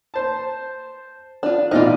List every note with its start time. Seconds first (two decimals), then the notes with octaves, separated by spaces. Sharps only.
0.14 C5 A5
1.43 D4 F4
1.71 A1 B2 D#4 F4 D5